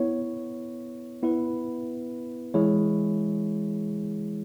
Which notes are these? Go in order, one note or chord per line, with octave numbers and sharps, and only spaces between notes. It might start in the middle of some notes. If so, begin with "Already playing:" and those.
Already playing: B3 E4 C#5
B3 E4 B4
E3 G#3 E4 G#4 C#5